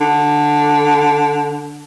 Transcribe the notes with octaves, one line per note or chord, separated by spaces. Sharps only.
D3